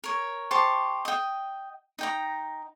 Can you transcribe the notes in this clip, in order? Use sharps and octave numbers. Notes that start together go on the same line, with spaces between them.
A#4 C#5
G4 C5 A5 C#6
D#5 G5
D#4 G5 A#5